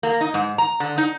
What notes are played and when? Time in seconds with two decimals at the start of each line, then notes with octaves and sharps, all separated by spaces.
0.03 A#3
0.21 D#4
0.34 G#2
0.58 A#5
0.80 D3
0.98 D#4